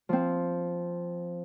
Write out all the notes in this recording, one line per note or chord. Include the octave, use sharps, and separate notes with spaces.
F3 C4